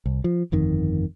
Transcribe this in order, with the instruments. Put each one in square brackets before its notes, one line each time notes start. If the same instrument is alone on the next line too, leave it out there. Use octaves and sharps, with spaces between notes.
[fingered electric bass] C2
F3
G1 F2 D#3